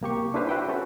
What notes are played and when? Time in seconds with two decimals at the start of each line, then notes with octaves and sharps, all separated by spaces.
0.01 C2 A#3 G4 C#6
0.34 D4 E4 G#4 B4 C5 F5
0.49 F#4 B4 E5 F#5 G5
0.69 C#4 F#4 A4